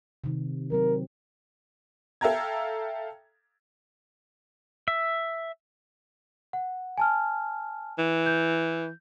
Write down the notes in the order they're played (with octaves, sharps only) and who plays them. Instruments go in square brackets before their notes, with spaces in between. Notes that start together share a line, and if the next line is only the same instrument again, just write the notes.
[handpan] C3 D#3
[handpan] F#3 C4 [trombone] A#4
[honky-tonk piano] A4 E5 F5 G5 A#5 G#6
[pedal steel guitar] E5
[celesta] F#5
G#5 A5 F6
[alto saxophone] E3
[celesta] G6